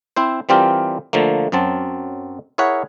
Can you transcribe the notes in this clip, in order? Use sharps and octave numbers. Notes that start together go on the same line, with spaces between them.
C4 E4 C5
E3 G3 C4 F4 G4 A#4
D3 F3 A3 A#3
F#2 F#3 C4 A5
E4 G#4 A#4 C#5 E5 F#5